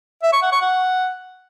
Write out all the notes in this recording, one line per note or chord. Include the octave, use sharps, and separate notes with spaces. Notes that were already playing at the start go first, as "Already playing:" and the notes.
E5
C#6
F#5
C#6
F#5